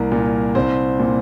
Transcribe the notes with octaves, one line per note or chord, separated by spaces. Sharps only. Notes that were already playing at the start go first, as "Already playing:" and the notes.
Already playing: C2 A#3 A#4
A#2
C2 C4 C5
A#2